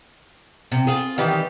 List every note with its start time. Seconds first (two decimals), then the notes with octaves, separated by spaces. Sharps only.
0.72 C3
0.87 F4 G#4
1.18 D#3 E3 G3